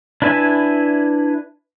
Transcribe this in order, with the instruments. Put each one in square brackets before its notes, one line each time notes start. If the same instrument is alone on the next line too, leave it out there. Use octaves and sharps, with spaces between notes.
[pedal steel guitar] D4 E4 B4 E5 G#5